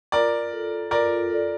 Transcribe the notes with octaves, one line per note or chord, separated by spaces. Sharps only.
F4 A#4 D5
A4 D5
F4 A#4 D5
A4 D5